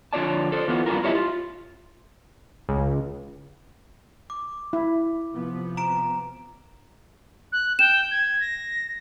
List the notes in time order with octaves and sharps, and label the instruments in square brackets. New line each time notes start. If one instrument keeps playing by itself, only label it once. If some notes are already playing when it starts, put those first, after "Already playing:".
[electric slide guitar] F2 D3 F4 C#5 D5 A5
A4 C5
E3 B3 F4
G2 E4 F4 A#4
E4 F4 G4 C#5 D#5 E5
F4
[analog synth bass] C#2
[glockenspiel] D6
[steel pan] E4
[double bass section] C3 F3 B3
[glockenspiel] A#5 D7 E7
[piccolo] F#6
[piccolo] G5 [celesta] E7
[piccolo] G#6
A#6